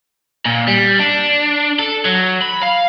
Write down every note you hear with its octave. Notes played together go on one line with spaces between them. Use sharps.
A#2
G3
D4
A4
F#3
B5
F5